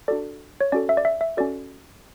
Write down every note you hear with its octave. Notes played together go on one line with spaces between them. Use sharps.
D4 F#4 A4 D5
C#5
C#4 F#4 A4 D5
E5
D5
E5
E5
C#4 F#4 A4 D5